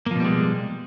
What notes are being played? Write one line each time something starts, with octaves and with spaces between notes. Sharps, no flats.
B2 F3 G3 G#3 A#3